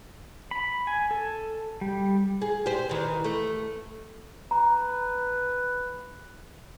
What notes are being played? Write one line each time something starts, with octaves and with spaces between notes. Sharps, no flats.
B5
G#5
A4
G3
G#4
G4 C5
D#3 E3
A3
B4 A#5